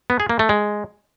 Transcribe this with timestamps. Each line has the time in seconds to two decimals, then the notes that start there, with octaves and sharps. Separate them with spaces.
0.10 B3
0.20 G#4
0.29 A#3
0.39 A3
0.49 G#3